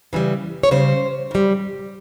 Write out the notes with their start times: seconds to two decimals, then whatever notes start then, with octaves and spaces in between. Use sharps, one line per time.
0.13 C#3 E3 G3
0.63 C#5
0.71 C#3 G3 C5
1.31 C#3 G3